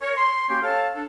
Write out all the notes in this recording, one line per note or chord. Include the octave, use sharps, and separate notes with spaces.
A#4 C#5
C6
A#3 C#4 F#4 G4 C#5 G5
A4 C#5 F5 A5
D4 A4